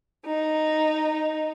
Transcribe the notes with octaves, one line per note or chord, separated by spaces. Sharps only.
D#4